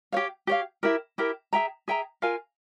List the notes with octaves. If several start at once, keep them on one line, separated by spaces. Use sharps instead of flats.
G4 C#5 F5
G4 C#5 F5
E4 G4 A#4
E4 G4 A#4
G#4 E5 G5 A#5
G#4 E5 G5 A#5
F4 A#4 F5 G#5